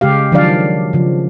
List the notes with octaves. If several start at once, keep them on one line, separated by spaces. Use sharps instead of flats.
C#3 G#3 G4 F5
D#3 F3 F#3 D4 D5 F5
C#3 F3